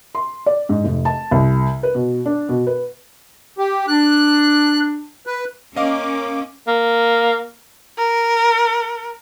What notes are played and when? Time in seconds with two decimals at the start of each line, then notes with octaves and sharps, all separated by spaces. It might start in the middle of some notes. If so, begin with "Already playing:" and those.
0.15 C6
0.46 D5
0.69 G#2
0.84 F1
1.05 A5
1.31 C2
1.83 B4
1.95 B2
2.25 D4
2.49 B2
2.67 B4
3.58 G4
3.88 D4 F#6
5.27 B4
5.76 A#3 C#4 D#5 F5 D6
6.67 A#3
7.98 A#4